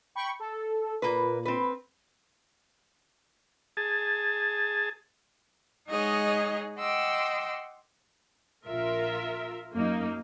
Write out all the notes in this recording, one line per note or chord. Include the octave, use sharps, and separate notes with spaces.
G5 B5 C#6
A4
A#2 A#3 B4
C4 B4
G#4 A5
G#3 D#4 G#4 C#5 D#5 F#5
D#5 F#5 G5 C6 D6 E6
A#1 F4 A#4 E5
F#2 A#3 D#4